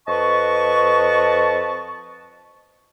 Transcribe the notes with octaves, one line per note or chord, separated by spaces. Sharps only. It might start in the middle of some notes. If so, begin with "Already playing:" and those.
F2 B4 D#5 A5 C#6